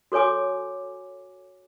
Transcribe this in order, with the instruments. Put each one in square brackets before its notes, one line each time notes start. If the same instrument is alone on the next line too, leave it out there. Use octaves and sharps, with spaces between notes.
[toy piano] F#4 A4 C#5 G#5 D6